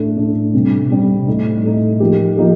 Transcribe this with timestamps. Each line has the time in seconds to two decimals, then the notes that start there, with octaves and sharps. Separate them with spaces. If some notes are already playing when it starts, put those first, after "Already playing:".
Already playing: A2 A3 D4 A4
0.17 A2 A3 D4 A4
0.54 C3 G3 C4
0.90 C3 G3 C4
1.27 A2 A3 D#4
1.64 A2 A3 D#4
2.00 F3 A#3 D#4 G4
2.37 F3 A#3 D#4 G4